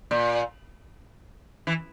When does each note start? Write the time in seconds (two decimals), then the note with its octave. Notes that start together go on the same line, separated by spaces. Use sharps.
0.11 A#2
1.67 E3